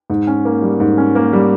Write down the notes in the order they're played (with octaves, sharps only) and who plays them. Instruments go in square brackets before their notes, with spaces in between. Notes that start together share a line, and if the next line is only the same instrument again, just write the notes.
[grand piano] G#2
C#4
A#3
G3
G#2
C#4
A#3
G3